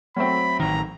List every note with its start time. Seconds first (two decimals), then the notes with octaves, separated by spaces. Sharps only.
0.16 F#3 A3 C4 B5
0.60 A1 D#3 A#5